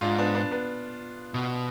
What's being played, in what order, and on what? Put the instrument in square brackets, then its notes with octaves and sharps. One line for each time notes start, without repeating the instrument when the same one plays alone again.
[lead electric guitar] G#2 [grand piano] D4 F4
[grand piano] B3 D4
B3 D4
B3 D4
[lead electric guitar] B2